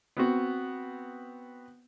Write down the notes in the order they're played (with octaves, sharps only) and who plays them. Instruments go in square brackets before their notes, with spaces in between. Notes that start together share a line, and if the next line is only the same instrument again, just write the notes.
[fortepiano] B3 C4 F#4